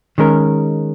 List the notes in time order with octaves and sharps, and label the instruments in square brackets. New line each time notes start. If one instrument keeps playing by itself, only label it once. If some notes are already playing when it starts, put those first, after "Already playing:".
[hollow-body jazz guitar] D#3 G#3 C#4 A#4